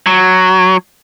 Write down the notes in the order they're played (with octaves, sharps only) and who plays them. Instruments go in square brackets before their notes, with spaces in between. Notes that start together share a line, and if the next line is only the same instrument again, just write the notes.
[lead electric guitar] F#3